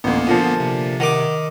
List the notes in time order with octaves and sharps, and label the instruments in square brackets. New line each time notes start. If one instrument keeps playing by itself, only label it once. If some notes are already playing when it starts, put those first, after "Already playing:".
[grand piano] A1 D2 [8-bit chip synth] A#3 B3
[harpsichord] A#2 [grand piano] D3 F3
[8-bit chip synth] C3
[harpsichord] D#3 D6 [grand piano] F#5